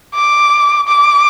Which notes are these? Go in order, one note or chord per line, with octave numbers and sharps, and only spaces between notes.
D6
D6